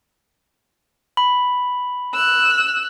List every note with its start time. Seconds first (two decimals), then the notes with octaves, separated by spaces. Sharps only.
1.17 B5
2.14 E6 F#6